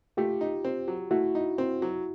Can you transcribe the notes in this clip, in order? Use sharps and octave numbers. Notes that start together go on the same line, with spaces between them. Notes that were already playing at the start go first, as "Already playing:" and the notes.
A3 F4 G4
D#4
C4
F#3
A3 E4 F#4
D#4
C4
F#3